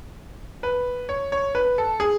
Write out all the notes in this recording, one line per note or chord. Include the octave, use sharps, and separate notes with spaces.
B4
C#5
C#5
B4
A4
G#4